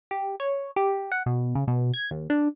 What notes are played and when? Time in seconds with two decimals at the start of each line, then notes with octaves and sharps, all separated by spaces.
0.11 G4
0.40 C#5
0.76 G4
1.12 F#5
1.26 B2
1.55 C#3
1.68 B2
1.94 G#6
2.11 D#2
2.30 D4